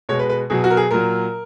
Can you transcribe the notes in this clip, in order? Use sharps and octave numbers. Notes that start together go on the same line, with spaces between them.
B2 G#3 C#5
B4
B4
B2 F#3 G#4
F#4
A#4
G#4
A#2 F#3 A#4